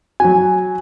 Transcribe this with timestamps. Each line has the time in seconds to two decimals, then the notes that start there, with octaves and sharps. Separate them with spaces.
0.20 F#3 F#4 G#5